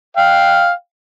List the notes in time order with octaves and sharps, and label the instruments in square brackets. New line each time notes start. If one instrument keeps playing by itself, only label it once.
[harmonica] F5 G5